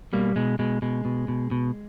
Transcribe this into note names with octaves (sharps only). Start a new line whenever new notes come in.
B2 G3 A#3
B2 G#3
B2 G#3
B2 G#3
B2
B2
B2